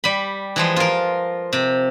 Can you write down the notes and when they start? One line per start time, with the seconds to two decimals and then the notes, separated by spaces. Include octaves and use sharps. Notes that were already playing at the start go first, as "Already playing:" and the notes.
0.04 G3 B5
0.56 E3 F3 G#3
0.76 F4 A#4
1.53 C3